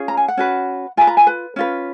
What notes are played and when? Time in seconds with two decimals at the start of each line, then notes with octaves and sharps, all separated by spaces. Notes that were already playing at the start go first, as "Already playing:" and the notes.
Already playing: C#4 F4 G#4
0.08 A#5
0.17 G#5
0.28 F#5
0.37 C#4 F#4 B4
0.97 F4 B4 G#5
1.07 A#5
1.17 G#5
1.27 B4
1.56 C#4 F4 B4